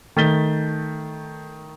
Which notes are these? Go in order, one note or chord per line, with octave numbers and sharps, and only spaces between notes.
D#3 A3 A6 B6 G7